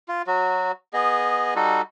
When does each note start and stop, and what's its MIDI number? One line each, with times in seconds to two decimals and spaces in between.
0.08 0.22 65
0.27 0.72 54
0.27 0.72 66
0.93 1.54 59
0.93 1.54 68
0.93 1.54 75
1.56 1.82 55
1.56 1.82 63
1.56 1.82 66
1.56 1.82 69